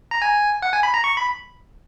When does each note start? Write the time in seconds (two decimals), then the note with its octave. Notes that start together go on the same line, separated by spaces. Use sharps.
0.11 A#5
0.22 G#5
0.62 F#5
0.73 G#5
0.83 B5
0.94 A#5
1.04 C#6
1.17 B5